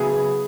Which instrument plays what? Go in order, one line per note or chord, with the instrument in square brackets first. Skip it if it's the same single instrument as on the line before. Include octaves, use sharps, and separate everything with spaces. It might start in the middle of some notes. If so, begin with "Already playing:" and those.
Already playing: [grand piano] C#3 F#3 B3 E4 G#4